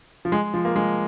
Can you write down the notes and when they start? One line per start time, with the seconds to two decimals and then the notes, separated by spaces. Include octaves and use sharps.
0.25 F3
0.32 G#3
0.54 F3
0.65 A#3
0.76 G#3